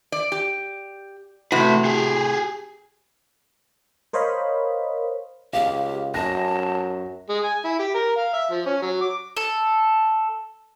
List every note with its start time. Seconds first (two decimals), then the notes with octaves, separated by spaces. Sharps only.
0.12 D5
0.32 G4
1.52 A2 C3 A3 F#4 B4
1.85 G4 G#4
4.13 A#4 C5 C#5 D#5 F5 B5
5.53 C#2 G4 F5
6.14 F#2 A5 A#6
7.29 G#3
7.44 G#5
7.65 E4
7.79 G4
7.95 A#4
8.17 F5
8.34 E5
8.51 F3
8.66 C#4
8.82 F#3
9.01 D6
9.37 A4